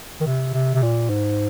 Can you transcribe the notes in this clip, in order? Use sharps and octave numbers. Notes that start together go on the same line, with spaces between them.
D#3
C3
C3
C3
A#2
G#2